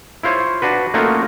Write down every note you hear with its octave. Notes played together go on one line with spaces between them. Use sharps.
E4 F4 C5 C#5
D4 F#4 B4
A3 A#3 C#4 D#4 F4 F#4